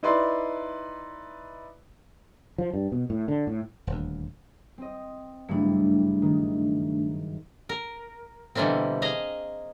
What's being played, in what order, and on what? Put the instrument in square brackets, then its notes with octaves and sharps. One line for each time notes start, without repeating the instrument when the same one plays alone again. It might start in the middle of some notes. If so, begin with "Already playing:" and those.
[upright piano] D#4 E4 B4 D5 C6
[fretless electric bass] F3
G2
B2
A2
D3
A2
[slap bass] D#1 D2
[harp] C4 D#5
[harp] F#1 G2 E3 [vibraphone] A3 D4
[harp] D#3
[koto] A#4
B2 D3 E3 G3 A#3 C4
G#4 D#5 F5 A#5